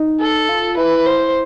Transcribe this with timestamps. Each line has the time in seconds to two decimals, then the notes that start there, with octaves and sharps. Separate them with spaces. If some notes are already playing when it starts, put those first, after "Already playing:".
Already playing: D#4
0.21 A4
0.49 F4
0.77 E4 B4
1.06 C5